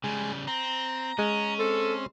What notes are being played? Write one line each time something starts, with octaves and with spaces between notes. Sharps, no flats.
C#3 G3 G#3
C4 A#5
G#3 C#4
C4 A4